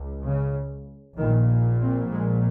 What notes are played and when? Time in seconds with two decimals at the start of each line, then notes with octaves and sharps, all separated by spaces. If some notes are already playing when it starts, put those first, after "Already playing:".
Already playing: C#2
0.25 C#3
1.18 A#1 A#2 D#3
1.81 C4
2.12 G#3